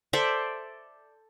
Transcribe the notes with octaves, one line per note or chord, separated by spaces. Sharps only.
A4 C5 D5 E5